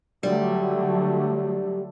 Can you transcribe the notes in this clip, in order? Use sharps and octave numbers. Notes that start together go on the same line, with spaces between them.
D3 F#3 G3 A3